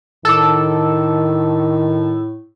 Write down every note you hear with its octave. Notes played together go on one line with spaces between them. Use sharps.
A2 D#3 A4 D6 E6